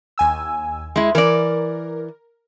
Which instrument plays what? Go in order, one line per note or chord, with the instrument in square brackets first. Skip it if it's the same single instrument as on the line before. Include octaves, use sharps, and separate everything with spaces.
[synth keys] D#2 G#5 E6
[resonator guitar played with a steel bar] G#3 E4
[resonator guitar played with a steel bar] E3 D5 [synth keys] A#4